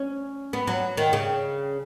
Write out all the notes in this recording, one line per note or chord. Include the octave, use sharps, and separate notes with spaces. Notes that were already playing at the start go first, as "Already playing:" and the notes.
Already playing: C#4
B3
F#3
D#3
C#3